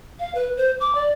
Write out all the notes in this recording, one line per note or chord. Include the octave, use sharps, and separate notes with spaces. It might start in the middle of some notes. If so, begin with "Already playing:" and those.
F5
B4
C5
D6
D5